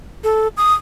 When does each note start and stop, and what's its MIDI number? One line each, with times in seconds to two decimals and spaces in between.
0.24 0.48 69
0.57 0.74 87